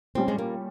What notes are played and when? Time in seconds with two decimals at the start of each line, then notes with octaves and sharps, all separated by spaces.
0.15 A#2 G3 C4 C#4
0.28 G#3
0.38 A#3